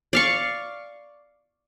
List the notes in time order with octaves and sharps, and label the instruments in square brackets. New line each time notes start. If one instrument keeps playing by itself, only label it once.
[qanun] D5 F5 C#6